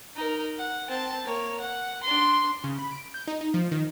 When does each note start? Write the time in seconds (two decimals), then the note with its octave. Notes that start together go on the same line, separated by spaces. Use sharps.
0.16 D#4 A#4
0.59 F#5
0.89 C4 A5
1.25 A#3 C#5
1.60 F#5
2.03 D4 C6
2.64 C#3
2.79 B5
2.91 D7
3.14 G6
3.27 D#4
3.41 D#4
3.54 F3
3.71 D#3